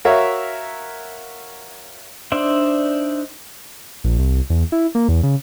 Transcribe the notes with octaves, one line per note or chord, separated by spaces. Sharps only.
F#4 A#4 C#5 E5 F5
D4 D#4 C5 D5 E5
A#1
C2
E2
E4
A#3
E2
C#3